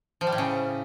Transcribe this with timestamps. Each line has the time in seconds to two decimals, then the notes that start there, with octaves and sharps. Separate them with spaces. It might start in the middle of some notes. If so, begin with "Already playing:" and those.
0.21 F3
0.27 G3
0.32 A2
0.38 C#3